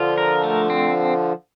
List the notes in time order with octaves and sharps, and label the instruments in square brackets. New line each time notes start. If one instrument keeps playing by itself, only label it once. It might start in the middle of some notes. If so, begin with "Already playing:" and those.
Already playing: [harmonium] D3 F3 [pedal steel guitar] F4
[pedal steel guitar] A#4
A3
C4